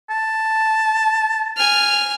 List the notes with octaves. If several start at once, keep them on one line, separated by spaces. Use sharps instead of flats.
A5
G#5 F6